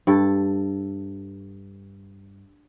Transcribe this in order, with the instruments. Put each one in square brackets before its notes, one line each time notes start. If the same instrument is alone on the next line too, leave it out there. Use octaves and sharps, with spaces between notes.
[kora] G2 A4